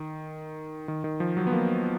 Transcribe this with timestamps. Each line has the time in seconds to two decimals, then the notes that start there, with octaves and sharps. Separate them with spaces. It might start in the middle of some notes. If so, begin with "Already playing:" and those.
Already playing: D#3
0.88 D#3
1.04 D#3
1.20 F3
1.37 F#3
1.47 B3
1.52 A#3